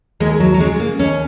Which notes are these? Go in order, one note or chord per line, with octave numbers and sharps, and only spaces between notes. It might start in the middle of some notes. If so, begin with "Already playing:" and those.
D#2 G#3
F#3
F#3
C#3 G#3
A#3
D#2 C#4